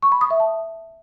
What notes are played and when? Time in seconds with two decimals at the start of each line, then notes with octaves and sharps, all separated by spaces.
0.03 C#6
0.12 B5
0.21 D#6
0.31 E5
0.40 A5